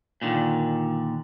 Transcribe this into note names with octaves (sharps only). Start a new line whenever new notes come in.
A#2 D3 D#3